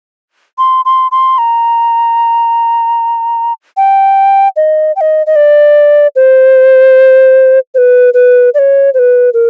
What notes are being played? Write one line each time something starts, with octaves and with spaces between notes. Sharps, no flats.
C6
C6
C6
A#5
G5
D#5
G5
D#5
D#5
D5
C5
C5
B4
B4
D5
C#5
C5
B4
A#4